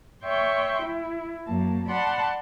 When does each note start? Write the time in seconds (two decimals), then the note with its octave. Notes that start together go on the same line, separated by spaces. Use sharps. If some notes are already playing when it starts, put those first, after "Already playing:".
0.23 C#5 E5 G5 C6 C#6
0.81 E4
1.46 F#2 A#3 A5
1.88 D5 F#5 A5 B5 C6